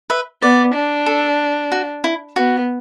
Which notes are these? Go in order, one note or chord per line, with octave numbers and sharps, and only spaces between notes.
B4 E5
B3 D5
D4
A4
F#4
E4
B3 F#4